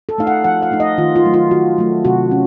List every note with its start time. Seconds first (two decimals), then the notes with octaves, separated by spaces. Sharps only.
0.09 A4
0.18 A3 D#4 F5
0.27 F#5
0.44 F3 F#5
0.62 F5
0.71 A3 D#4
0.80 D#5
0.98 D#3 F4
1.16 F4
1.25 F#3 A3
1.34 F4
1.51 D#3 F#4
1.78 F#3 A3
2.05 C3 F#4
2.31 C#4